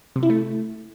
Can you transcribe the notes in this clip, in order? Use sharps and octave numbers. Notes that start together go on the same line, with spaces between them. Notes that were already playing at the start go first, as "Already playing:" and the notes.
C3
E4
A3